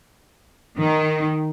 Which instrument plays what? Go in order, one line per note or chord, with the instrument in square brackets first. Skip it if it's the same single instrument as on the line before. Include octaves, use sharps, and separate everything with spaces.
[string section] D#3